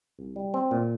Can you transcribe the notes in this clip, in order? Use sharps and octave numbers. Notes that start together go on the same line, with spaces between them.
C2
G3
C4
A#2